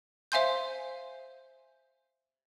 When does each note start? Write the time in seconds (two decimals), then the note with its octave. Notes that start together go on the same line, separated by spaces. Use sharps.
0.32 C5 E5 F5 G#5 C6 G6